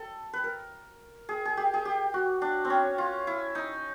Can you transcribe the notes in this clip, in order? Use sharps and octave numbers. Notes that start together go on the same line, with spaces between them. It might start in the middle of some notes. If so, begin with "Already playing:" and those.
Already playing: A4
B4
A#4
G#4
G#4
G4
G#4
G4
F#4
D4
C4
C#4
F4
E4
D#4